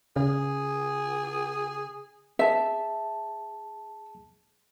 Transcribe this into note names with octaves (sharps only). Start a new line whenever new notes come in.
C#3 G#4
G#4 E5 A5